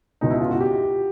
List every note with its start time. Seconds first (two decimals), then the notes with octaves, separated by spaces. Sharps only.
0.21 C#2 B2 D#4
0.31 E4
0.41 F4
0.51 F#4
0.60 G4